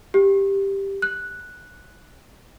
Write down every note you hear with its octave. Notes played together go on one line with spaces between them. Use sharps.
G4
F#6